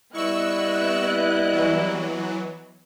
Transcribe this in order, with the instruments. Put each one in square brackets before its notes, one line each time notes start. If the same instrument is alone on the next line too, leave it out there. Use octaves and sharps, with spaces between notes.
[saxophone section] G3 E4 [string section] B3 D#5 F#6 [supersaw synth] C#6 E6
[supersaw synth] E3 F#3